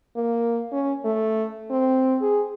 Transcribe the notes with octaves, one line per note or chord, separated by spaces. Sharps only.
A#3
C#4
A3
C4
G#4